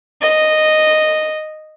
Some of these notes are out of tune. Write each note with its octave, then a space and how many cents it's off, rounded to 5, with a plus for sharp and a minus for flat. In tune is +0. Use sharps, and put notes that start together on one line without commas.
D#5 -5